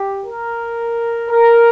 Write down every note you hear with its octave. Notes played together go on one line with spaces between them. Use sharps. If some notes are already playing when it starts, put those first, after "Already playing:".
Already playing: G4
A#4
A#4